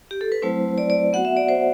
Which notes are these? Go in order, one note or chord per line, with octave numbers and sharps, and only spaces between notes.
G4
A4
B4
F#3 A3 C4 E4 C5
D5
D5
B3 F#4 F#5
E5
D5
C5